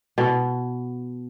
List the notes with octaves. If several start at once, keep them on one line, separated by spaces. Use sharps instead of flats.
B2